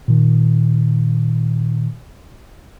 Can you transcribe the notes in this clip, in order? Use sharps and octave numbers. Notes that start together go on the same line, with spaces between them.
A#2 D#3